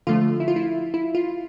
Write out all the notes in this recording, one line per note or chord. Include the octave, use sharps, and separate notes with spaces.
D3 F3 A3 F4
E4
F4
E4
E4
F4